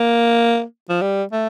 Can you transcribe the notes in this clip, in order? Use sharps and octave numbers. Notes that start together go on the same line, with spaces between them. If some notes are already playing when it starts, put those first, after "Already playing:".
Already playing: A#3
F3
G3
A3